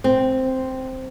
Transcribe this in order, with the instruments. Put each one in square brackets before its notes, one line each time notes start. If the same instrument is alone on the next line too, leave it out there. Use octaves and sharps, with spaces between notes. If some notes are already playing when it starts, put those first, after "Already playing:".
[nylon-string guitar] C4